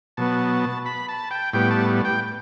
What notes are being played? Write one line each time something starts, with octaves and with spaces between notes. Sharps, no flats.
B2 F#3 B3 A5
B5
A5
G5
A2 G3 B3 G5
A5
G5